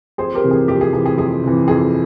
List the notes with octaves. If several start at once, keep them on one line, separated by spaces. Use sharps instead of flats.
F2 G#4 C5
G4 A#4
C3 E3
G#4
F2 G4
G#4
C3 E3 G#4
G#4
F2 G#4
C3 E3
F2 G#4